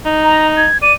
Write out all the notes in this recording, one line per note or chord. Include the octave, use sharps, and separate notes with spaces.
D#4
A#5
G#6
D5 D#7